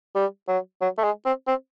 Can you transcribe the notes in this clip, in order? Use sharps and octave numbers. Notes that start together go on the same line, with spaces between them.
G3
F#3
F#3
A3
G#3
C4
C4